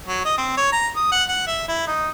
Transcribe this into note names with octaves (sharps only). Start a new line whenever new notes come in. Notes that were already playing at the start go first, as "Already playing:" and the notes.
F#3
D#5
C4
C#5
A#5
D#6
F#5
F#5
E5
E4
D#4